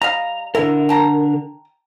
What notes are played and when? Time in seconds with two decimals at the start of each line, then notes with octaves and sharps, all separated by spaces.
0.02 G3 D#5 F5 A#5
0.55 D3 E4 A#4
0.89 G5 A5 A#5